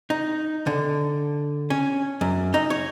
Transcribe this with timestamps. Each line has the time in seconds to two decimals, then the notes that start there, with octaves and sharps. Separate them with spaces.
0.10 D#4
0.67 D3
1.70 C#4
2.21 F#2
2.54 D#4
2.70 C#5